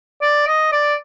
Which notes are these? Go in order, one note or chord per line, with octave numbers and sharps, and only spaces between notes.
D5
D#5
D5